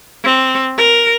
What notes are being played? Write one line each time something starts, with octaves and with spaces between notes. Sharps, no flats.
C4
A#4